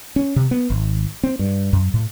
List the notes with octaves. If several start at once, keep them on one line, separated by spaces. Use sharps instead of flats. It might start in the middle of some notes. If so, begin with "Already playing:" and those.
C#4
C3
B3
G#1
C4
G2
F#2
A2